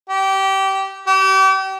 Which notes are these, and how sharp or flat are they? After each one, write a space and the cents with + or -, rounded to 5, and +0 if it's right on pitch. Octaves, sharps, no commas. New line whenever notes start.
G4 -20
G4 -35